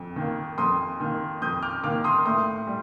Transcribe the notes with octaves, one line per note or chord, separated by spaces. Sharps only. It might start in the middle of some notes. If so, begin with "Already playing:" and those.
Already playing: F2
D#3 A#3
F2 C6 D#6
D#3 A#3
F2 D#6 G6
D6 F6
D#3 A#3 D6 F6
C6 D#6
A2 C6 D#6
G3